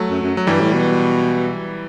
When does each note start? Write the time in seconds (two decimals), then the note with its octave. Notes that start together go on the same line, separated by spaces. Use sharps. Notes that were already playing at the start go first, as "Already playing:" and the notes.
Already playing: F#3 A3
0.09 F#2
0.22 F#2
0.37 F#3
0.47 G2 E3 G3
0.60 A2
0.73 B2